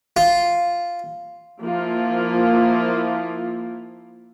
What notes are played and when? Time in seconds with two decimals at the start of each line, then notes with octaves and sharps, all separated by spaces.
0.17 F4
1.61 F3 A#3 E4 F4